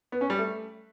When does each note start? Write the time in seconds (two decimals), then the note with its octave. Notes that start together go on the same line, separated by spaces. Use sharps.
0.12 B3
0.21 C#4
0.30 G3
0.39 A3